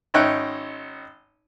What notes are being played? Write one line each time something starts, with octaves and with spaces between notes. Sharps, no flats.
G#1 C#4 D#4 E5 G5 F#6